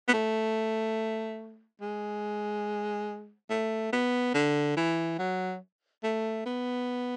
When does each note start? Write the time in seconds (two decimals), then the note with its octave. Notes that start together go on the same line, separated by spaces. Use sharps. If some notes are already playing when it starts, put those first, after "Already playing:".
0.08 B3
0.13 A3
1.81 G#3
3.50 A3
3.93 B3
4.34 D3
4.77 E3
5.19 F#3
6.03 A3
6.46 B3